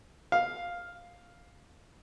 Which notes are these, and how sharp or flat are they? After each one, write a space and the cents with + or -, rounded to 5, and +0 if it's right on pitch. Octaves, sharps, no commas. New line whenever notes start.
F5 +5